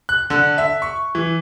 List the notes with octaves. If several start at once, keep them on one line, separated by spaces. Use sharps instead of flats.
F#6
D3
E5
C#6
E3